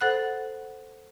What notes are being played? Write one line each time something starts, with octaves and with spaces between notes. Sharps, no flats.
A4 C5 F#5 B5 F#6